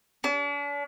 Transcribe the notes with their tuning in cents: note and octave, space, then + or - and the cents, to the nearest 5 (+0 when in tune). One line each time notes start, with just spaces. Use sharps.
D4 -45